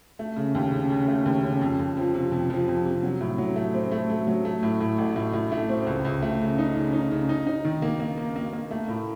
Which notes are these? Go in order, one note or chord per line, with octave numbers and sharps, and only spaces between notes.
A3
C#3
D#2
C#3
C#3
A3
D#2
C#3
F2
F2
F3
C3
F2
F3
F2
C3
F#3
A2
F#3
A3
C4
A3
A3
F#3
A3
A2
A2
A1
A2
A2
A3
C4
C#2
C#2
A3
C#3
D#4
C#3
D#4
C#3
D#4
D#4
D#3
A#3
A#3
A#3
A#3
A#3
A3
A2